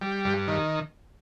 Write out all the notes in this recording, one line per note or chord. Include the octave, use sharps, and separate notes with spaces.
G3
G2
D#3